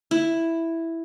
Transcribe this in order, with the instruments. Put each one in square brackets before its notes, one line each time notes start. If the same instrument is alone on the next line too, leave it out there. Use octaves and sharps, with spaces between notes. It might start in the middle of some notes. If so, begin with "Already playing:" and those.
[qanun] E4